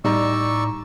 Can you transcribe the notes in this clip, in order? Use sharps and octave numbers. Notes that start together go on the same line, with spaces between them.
A2 G3 D#4 D5 A#5 C#6 E6